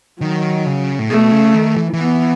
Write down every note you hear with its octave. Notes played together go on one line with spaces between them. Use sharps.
D#3 F#3
C#3
A2
B2 A3
C#3
D#3
E3
E3
B3